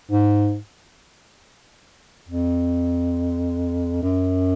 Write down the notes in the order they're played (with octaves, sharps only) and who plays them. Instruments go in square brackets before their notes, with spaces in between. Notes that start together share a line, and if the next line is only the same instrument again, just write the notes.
[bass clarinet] G#2
F2
F#2